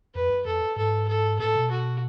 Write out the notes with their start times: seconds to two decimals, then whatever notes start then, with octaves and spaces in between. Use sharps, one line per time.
0.14 F2 B4
0.30 F#2
0.45 F2 A4
0.76 G#2 A4
1.08 A4
1.39 A2 A4
1.55 B2
1.70 F#4